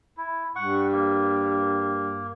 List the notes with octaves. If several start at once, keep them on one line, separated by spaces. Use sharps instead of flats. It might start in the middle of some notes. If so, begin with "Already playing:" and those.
E4
G2 F#5 C#6
A#3